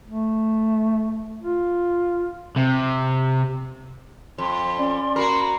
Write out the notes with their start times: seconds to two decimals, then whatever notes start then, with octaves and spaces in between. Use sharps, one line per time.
0.07 A3
1.42 F4
2.57 C3
4.38 F2 C6
4.78 C#4 D5
5.16 A#3 F#4 A#4 B5 C6